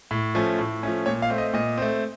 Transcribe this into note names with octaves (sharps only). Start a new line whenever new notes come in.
A2
F3 A3 C#4
A2
F3 A3 C#4
A#2 C#5
F5
A3 C4
D#5
A#2 D#5
A3 C4